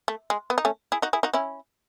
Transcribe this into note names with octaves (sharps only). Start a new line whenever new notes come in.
A3
G#3
B3
D#4
A3 C#4
E4 G#4
D#4 F#4
E4 G#4
D#4 F#4
C#4 E4